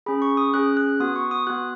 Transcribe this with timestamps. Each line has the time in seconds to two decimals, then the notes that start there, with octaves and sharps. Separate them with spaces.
0.06 C#4 G#4 B5
0.22 C#6
0.37 D#6
0.54 C#4 G#4 F#6
0.77 F#6
1.00 B3 F#4 D#6
1.16 C#6
1.31 D#6
1.47 B3 F#4 F#6